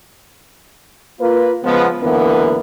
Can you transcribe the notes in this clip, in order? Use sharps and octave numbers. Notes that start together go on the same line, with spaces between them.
A#3 F4 B4
C#3 F3 G#3 B3
C#2 F#2 D3 E3 A#3 B3